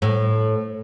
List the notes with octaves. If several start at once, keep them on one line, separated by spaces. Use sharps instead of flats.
A2